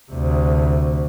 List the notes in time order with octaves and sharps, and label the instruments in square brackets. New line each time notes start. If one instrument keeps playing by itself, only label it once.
[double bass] D2 C3